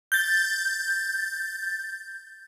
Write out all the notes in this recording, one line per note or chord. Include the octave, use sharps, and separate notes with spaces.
G6 A6